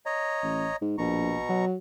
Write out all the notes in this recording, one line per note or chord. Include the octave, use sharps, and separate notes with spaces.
C#5 D#5 A#5
A1
G#2
A#1 B2 A#5 C#6
F#3